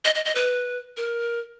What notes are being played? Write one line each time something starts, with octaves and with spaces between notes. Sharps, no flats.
D#5
D#5
D#5
B4
A#4